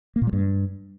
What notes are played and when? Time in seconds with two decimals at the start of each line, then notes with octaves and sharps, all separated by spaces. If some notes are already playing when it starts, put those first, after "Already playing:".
0.16 A#3
0.22 A#2
0.27 G3
0.33 G2